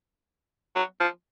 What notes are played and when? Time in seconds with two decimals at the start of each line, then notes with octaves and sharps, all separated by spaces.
0.76 F#3
1.00 F3